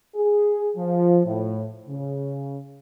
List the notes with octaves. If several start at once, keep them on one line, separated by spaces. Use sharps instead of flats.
G#4
F3
A2
C#3